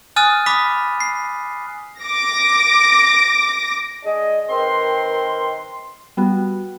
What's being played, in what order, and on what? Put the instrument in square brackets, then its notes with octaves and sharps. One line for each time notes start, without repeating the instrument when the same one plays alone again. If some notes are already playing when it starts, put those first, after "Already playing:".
[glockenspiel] G#5 D#6 F6 F#6 A6 D#7
B5 D6 D#6 F6 B6
C7
[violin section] D6 A#6
[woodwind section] G#3 D4 G#4 D#5
D#3 C4 A#4 B4 G5 C6
[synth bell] G3 B3 F#4